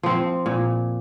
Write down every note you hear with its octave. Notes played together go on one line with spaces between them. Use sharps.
F3 C4
A#2